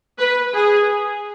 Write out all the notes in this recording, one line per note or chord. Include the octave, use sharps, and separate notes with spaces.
B4
G#4